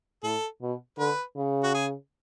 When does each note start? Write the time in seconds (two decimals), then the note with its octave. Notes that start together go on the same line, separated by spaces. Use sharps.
0.23 A2 A4
0.61 B2
0.98 D3 B4
1.37 C#3
1.63 F#4
1.74 G#4